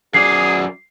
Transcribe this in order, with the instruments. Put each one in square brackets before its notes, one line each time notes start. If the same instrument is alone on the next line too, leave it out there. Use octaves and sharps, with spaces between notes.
[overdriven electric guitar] F#2 D5 [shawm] G#4 [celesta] C7